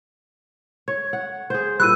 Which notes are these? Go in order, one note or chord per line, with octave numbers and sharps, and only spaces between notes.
C#5 G#6
F#5
G#4 C5
G2 A#2 B5 E6 F#6 D#7